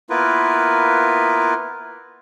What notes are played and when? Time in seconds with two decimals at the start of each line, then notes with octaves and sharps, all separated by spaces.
0.10 A#3 B3 E4 F4 A#4 B4